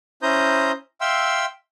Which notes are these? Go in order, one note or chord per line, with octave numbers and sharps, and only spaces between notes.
C#4 E4 C5 A#5 D#6 G6
E5 F5 G5 C6 E6